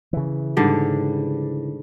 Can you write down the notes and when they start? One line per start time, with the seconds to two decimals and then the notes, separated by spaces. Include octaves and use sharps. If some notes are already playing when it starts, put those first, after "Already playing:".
0.13 C#3 E3
0.57 G#2 D3 G3